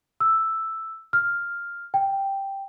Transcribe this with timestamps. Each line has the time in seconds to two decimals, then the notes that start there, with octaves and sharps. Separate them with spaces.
0.20 E6
1.13 F6
1.94 G5